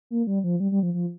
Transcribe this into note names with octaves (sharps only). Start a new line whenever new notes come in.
A#3
G3
F3
G3
G3
F3
F3